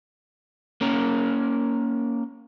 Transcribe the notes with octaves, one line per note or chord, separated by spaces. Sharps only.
A#3 C#4 A#4